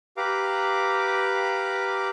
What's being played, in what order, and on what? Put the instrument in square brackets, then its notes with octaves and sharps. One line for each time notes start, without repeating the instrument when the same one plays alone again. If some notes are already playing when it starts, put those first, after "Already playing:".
[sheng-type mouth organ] G4 B4 F5 A#5 D6